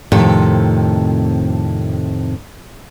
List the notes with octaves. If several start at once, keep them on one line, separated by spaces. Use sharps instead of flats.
F2 A2 C3 D#3 A4